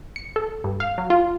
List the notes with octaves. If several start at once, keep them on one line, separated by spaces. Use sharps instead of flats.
C#7
A4
G2
F5
F#3
F4